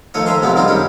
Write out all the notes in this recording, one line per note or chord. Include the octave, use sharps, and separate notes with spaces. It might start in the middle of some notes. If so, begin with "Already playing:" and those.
D#3 F3 A3 C#5 D#5
C5 E5 F5 G#5 A#5 C6
C3 F3 F#3 G#3 A#3 B3
D#3 G3 G#3 C4 D#4 F4
F#2 G3 A#3 C#4 G#4